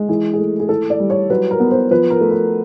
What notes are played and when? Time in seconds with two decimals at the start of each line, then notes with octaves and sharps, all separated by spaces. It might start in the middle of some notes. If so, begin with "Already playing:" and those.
Already playing: G#3
0.09 E3 G#4
0.33 A3 G#4
0.60 G#4
0.69 E3 A4
0.90 D5
1.00 G3
1.10 C#5
1.30 F#3 B4
1.51 A#4
1.60 B3
1.71 C5
1.91 F3 B4
2.10 A#4
2.21 A3
2.31 A#4